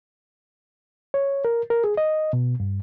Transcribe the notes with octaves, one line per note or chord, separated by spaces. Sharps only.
C#5
A#4
A#4
G#4
D#5
B2
G2